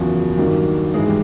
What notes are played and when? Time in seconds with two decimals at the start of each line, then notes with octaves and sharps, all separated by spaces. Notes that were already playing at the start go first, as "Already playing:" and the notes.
Already playing: F#1 E2 C#3 F3 F#4
0.37 G2 D#3 F#3 A#3
0.94 G#2 E3 G#3 G#4
1.08 G3